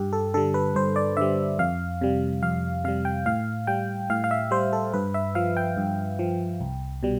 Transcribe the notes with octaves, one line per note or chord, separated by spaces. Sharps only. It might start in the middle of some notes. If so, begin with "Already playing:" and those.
Already playing: G2 G4
A4
D3 G3 A4
B4
G2 C5
D5
D3 G3 E5
F2 F5
C3 G3
F2 F5
C3 G3 F5
G5
A2 F5
G3 G5
A2 F5
F5
E5
G3 C5
A4
G2 B4
E5
F3 F5
G5
G2
F3
C2
B2 G3